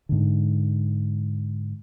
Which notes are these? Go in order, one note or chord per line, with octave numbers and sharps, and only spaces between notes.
G#2 D3